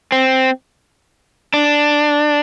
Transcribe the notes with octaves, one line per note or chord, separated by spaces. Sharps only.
C4
D4